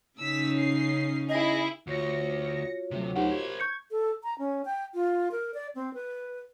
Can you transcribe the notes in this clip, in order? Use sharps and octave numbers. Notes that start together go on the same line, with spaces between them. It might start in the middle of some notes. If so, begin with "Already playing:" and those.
C#3 C#4 D#4 E6 B6
C7
E4 G#4 D#5
D2 F4 F#4 C#5 A#6 C#7
D2 C3 F#3
D#4 G4 A#4 C5 F#5
G4 G#6
C#6 G6 C#7
A4
A#5
C#4
G5
F4
A#4
D5
C4
B4